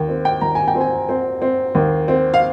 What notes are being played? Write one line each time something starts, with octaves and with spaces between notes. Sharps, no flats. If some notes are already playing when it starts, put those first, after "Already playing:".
Already playing: D#2 G5
C4
G5
D#2 A#5
G#5
G5
C4
G#5
C4
C4
D#2
C4
F5